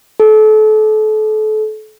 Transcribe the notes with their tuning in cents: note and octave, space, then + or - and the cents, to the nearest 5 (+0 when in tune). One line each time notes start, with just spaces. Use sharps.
A4 -30